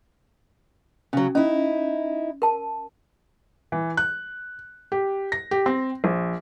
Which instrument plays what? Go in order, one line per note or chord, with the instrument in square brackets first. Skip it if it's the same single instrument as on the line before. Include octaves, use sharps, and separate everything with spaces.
[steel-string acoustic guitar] C#3 F#3 [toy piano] C#4
[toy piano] C#4 [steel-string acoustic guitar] D#4 E4
[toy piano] A#4 A5
[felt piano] E3
F#6
G4
A#6
G4
C4
A#1